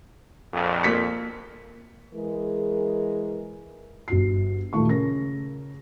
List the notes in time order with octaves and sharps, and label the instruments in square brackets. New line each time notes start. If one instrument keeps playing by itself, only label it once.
[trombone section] A#1 F2
[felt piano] A#3 B6 C#7
[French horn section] E3 G#3 G#4 A#4
[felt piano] G1 F#4 C7
D#1 D#3 E3 A3 F4 C#6
C#3 A#4 A#6